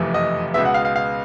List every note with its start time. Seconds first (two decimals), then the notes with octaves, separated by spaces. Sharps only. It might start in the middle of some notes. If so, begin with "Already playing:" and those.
Already playing: F#1 F2 C3 E3 A3
0.14 D#5
0.54 C#2 B2 G#3 B3 E5
0.65 F#5
0.74 F5
0.85 F5
0.96 F5